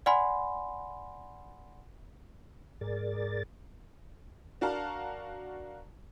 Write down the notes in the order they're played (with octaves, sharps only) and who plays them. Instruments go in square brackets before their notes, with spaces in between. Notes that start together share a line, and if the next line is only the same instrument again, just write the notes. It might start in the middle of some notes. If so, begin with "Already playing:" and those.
[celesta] D5 F#5 G#5 B5 C6
[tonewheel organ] G#2 G#4 A#4 D5 A6
[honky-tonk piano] D4 F#4 A#4 F5 A5 A#5